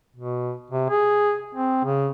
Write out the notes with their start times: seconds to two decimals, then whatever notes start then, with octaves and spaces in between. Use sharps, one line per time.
0.16 B2
0.70 C3
0.89 G#4
1.55 C4
1.84 C#3